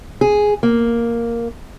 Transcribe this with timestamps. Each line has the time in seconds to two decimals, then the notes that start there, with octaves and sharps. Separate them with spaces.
0.21 G#4
0.63 A#3